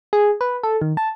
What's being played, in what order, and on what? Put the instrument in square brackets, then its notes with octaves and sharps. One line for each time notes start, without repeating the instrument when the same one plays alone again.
[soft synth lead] G#4
B4
A4
D#3
A5